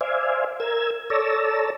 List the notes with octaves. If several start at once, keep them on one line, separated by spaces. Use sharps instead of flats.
C5 D5 E5 F5 G#5
A#4 E6 G#6
A4 C#5 D5 A5 A#5 E6